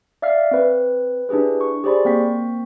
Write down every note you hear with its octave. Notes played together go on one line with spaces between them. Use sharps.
D5 E5 F5 F6 C7
C4 B4
D4 E4 G4 G#4 B4
C#6
G4 G#4 C5 D5 B5 C6
A#3 C4 G5 C#6 B6